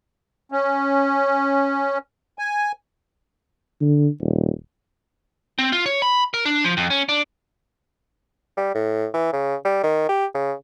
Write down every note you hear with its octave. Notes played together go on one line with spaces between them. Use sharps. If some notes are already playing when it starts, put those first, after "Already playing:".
C#4
G#5
D3
D#1
C4
F4
C#5
B5
A#4
D4
F3
F2
C#4
D4
G3
A2
E3
C#3
G3
D#3
G4
C#3